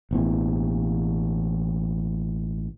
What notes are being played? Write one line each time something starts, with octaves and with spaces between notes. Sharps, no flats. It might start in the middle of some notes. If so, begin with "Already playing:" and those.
A1 B2 E3